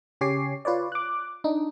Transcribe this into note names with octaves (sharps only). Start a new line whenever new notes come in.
C#3 G4 C#5 G#5 D6 C7
F4 B4 C#5 D5
D6 F#6
D4 D#4